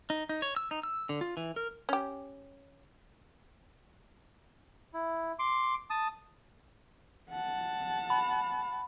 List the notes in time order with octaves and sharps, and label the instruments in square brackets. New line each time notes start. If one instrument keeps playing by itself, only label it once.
[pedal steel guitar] D#4
D#4
C#5
E6
D#4
E6
D3
F4
E3
A#4
[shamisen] C#4 G4
[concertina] E4
C6 D6
A5 D#6
[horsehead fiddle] F#5 A5
[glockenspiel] B5